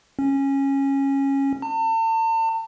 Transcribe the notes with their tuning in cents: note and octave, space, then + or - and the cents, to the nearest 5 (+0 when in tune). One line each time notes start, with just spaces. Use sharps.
C#4 -15
A5 +40